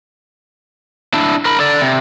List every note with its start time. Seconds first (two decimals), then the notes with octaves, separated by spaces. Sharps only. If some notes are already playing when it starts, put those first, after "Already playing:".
1.14 D4 E4
1.45 A#4 B5
1.60 A4 D5
1.81 C3